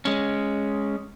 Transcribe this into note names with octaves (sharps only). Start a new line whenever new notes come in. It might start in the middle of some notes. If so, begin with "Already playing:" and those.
G#3 C#4